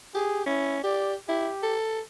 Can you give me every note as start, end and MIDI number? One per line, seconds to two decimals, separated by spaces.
0.15 0.44 67
0.15 0.46 68
0.46 0.82 61
0.46 0.77 64
0.84 1.15 67
0.84 1.14 74
1.28 1.49 64
1.28 1.76 67
1.63 2.00 69